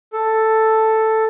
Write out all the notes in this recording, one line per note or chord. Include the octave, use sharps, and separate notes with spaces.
A4